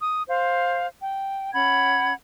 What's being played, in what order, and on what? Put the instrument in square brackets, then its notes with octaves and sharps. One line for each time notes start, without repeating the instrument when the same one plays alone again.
[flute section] D#6
C5 F5
G5
C#4 F#5 B5 G#6